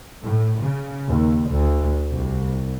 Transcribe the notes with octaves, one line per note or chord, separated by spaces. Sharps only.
A2
C#3
D#2
D2
C2